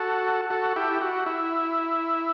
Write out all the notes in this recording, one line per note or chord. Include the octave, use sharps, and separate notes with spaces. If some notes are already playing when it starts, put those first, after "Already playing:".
Already playing: F#4 A4
F#4 A4
E4 G4
F#4
E4